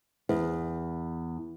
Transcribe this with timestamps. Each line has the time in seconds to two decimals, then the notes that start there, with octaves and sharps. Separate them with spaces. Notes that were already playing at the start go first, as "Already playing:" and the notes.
0.29 E2